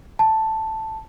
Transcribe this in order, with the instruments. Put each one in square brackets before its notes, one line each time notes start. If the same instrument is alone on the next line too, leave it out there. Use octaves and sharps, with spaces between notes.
[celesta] A5